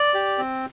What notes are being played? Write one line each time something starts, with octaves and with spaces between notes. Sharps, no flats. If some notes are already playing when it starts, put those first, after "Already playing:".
Already playing: D5
G4
C4